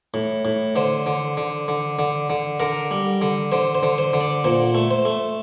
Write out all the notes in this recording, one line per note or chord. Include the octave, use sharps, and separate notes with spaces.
A2
A2
D3 C5
D3
D3
D3
D3
D3
D3 A#4
G3
D3
D3 C5
C5
D3
C5
D3
D5
A#2 C5
A3
C5
A3